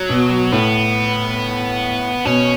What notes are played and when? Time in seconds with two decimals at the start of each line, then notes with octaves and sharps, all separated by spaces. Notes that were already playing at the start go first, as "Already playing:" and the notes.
Already playing: F#3
0.09 B2
0.52 A2 B3
2.25 B2 C#4